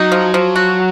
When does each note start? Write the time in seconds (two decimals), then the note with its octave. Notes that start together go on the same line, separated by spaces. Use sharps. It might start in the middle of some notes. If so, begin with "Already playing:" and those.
Already playing: F#3 D#4
0.12 F3
0.34 F3
0.56 F#4